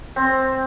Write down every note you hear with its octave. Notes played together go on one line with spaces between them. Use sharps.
C4